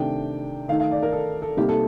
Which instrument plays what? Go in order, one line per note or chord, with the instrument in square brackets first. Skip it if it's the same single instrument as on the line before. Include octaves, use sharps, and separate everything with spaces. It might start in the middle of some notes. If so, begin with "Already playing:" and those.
Already playing: [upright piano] C3 D#3 A3 D4 G5
D#3 A3 D#4 F5
F5
D5
A#4
A4
A4
C3 G3 A#3 D#4 G4
A4